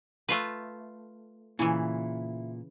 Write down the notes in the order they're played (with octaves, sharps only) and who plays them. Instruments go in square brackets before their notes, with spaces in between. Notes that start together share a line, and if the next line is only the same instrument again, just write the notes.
[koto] A3 F4 B4
[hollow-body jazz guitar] A#2 [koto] C#3 E3 [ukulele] E4